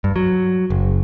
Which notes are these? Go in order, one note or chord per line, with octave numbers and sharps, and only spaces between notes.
G2
F#3
F#1